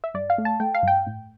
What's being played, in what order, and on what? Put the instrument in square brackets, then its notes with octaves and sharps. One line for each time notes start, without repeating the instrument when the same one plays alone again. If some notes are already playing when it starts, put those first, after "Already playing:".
[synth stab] E5
G2 D5
F5
A3
A5
A3 G5
F5
G2 G5
A2